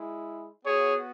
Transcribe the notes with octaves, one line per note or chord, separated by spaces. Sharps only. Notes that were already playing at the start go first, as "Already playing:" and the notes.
Already playing: G#3 E4
B3 F#4 G#4 C#5